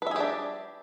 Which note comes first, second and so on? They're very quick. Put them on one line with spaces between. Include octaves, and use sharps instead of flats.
B4 E5 G#4 G4 D4